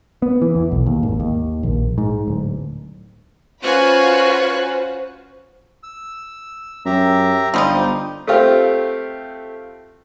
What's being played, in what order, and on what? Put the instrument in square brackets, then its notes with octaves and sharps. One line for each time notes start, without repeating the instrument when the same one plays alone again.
[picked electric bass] B3
E3
E2
B1
D#2
G#1
D#2
A#1
G#2
D1
[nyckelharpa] C#4 G#5 [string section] F4 F#4 B4 [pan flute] C5 [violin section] C#6 F#6
[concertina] E6
[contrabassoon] F#2 [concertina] G4 E5 A#5
[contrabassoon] G1 [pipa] F3 G3 D#4 [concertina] G4 C5 D#5
[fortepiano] A3 C4 F4 G4